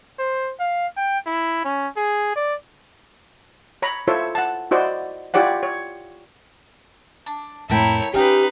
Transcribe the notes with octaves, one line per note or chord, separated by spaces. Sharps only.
C5
F5
G5
E4
C#4
G#4
D5
C#5 A#5 B5
E4 F4 A4 C5 C#5 E5
F#5 A5
E4 F#4 C5 D5 D#5
E4 F4 G4 C#5 D5 F#5
C#5
D4
F2 A2 E4 A4 A#4 C#5 G5
C#4 D#4 G4 G#4 B4 F5 G5